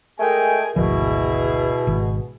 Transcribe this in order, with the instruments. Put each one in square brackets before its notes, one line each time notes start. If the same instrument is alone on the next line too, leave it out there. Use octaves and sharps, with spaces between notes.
[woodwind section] G#3 A3 G5 [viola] G#4 A#4 [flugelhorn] G#5
[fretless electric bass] G#1 D2 F3 [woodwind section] B2 [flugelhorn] E4 [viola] G#4
[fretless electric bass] G#1 D#3